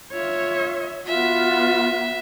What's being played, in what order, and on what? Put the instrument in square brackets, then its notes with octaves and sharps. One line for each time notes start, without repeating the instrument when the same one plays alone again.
[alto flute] F4 [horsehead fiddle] C#5 E5
[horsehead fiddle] B3 F#4 [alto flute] F4 [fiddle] E5